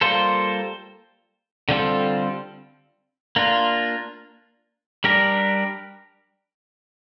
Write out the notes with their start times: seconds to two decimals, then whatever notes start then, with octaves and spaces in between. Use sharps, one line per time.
0.01 G3 A#3 F4 A4 C5
1.69 D3 G3 C4 F4 A4
3.36 A#3 D4 F4
5.04 G3 D4 G4 A#4